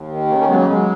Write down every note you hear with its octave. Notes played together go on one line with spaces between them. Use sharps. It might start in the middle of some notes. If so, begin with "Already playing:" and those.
Already playing: D#2
D#3
C#3 A#3
A#3 C#4
F#3 G#3 B3
A#3
F#3 G#3